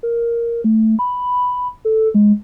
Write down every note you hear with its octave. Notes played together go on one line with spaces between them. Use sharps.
A#4
A3
B5
A4
G#3